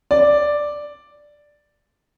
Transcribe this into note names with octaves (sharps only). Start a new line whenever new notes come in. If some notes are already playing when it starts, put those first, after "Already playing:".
D5